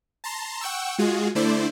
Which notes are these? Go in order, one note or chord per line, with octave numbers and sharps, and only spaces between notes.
A5 A#5 C6
F#5 G5 C#6 E6
G#3 F4 F#4 G#4
D3 A3 E4 C5 D5